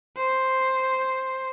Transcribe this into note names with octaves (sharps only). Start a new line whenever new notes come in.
C5